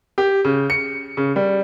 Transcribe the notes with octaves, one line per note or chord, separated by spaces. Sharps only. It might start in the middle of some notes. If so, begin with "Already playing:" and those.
G4
C#3
C#7
C#3
G3